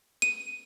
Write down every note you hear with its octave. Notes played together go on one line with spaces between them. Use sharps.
D#7